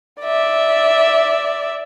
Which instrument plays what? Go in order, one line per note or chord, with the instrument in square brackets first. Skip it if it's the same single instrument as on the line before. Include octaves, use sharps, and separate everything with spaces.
[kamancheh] D5 E5